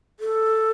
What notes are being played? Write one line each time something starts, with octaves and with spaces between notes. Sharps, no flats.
A4